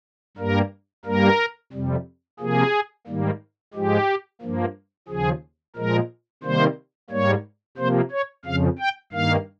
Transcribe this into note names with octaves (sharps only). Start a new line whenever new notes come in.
G2 G3 A#3 A#4
G2 G3 A#3 A#4
F2 C3 G3
C3 F3 A#3 G#4
G#2 D#3 G3 A#3
G#2 F3 G#3 G4
G2 F3 A#3
D#2 C#3 F3 G#4
A#2 F3 G#3 A#4
C3 D#3 G3 A#3 C5
G#2 G3 A#3 C#5
C3 F3 A#3 C5
C#5
F2 C#3 F3 F5
G5
G2 D#3 A#3 F5